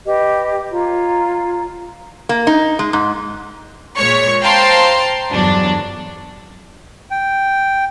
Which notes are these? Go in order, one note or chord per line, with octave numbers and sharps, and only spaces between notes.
G4 B4 D#5
F4 C#5 A#5
A#3
D#4
G#3
G#2
A#2 G#3 C#5 C#6
C5 F5 G5 A5 A#5 C6
G1 E2 F#3 D4
G5